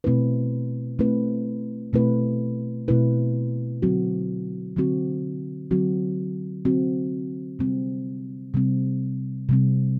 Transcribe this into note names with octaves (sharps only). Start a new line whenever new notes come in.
B2 A3 C4 E4 B4
B2 A3 C4 E4 B4
B2 A3 C4 E4 B4
B2 A3 C4 E4 B4
D3 F#3 C4 F#4
D3 F#3 C4 F#4
D3 F#3 C4 F#4
D3 F#3 C4 F#4
C3 G3 C4
C3 G3 C4
C3 G3 C4